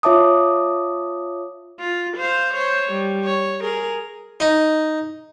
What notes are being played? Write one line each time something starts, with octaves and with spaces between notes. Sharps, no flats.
F4 C#5 E5 A5 D6 D#6
F4
C5 F5
C5 C#5
G3
C#5
G#4 A#4
D#4